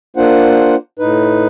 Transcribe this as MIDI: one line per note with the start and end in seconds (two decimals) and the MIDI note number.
0.17 0.75 58
0.17 0.75 62
0.17 0.75 65
0.17 0.75 72
0.17 0.75 78
0.99 1.47 45
0.99 1.47 63
0.99 1.47 71